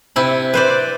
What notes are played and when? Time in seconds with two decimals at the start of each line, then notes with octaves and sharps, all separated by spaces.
0.16 C3 E4 B5
0.54 B4 C5 D5